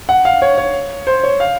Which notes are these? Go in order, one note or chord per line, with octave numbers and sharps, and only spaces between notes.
F#5
F5
C#5
C#5
C5
C#5
F5